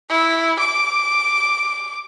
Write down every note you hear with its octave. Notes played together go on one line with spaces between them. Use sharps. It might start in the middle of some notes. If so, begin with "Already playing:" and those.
E4
D6